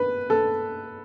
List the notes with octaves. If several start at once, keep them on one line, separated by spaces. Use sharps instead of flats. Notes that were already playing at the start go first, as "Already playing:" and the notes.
Already playing: B4
A4